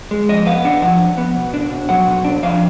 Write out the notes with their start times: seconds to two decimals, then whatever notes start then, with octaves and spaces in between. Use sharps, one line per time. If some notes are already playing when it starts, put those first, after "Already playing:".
0.11 G#3
0.29 F2 D#5
0.46 B3 F5
0.65 D4 F#5
0.82 F3 F#5
1.01 F2
1.18 B3
1.36 B2
1.54 D4
1.71 B2
1.89 F#3 F#5
2.07 B2
2.24 D4
2.42 F2 F5